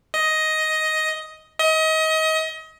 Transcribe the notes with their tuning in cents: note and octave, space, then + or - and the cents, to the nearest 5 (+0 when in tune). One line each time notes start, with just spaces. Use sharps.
D#5 +10
D#5 +30